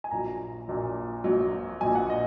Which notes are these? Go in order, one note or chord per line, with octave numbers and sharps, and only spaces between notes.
G#5
A#1 A#2 F#3 A#5
A#1 A#2 F#3
A#1 A#2 F#3
A#1 A#2 F#3 G#5
F#5
D#5